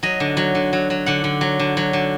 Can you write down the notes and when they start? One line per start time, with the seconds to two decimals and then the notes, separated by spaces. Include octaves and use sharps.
0.03 F#3 D#5
0.20 D3
0.37 F#3
0.55 D3
0.73 F#3
0.90 F#3
1.06 D3 F#5
1.24 D3
1.41 F#3
1.59 D3
1.77 F#3
1.93 D3